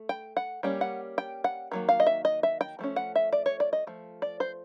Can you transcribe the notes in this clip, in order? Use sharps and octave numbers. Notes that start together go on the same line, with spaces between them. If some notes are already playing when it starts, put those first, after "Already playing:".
Already playing: A3
G5
F#5
G3 A#3 C#4 G5
F#5
G5
F#5
D#3 F#3 A#3
F5
D#5
E5
D#5
E5
G5
F3 A3 C#4
F#5
E5
D5
C#5
D5
D#5
F3 A3
D5
C5